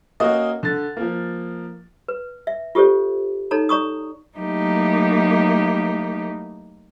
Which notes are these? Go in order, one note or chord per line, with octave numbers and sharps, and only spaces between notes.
A#3 C#4 F#4 D#5
D3 A6
F3 A#3
B4
E5
F4 G4 A4 C5 D5
D#4 A4 C#5 A#5
D5 A#5 C#6 D#6
F#3 A3 A#3 D#4 E4 G4